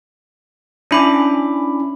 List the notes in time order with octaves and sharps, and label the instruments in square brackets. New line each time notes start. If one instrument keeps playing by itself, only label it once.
[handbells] C#4 B5 D6 [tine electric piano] D4 E4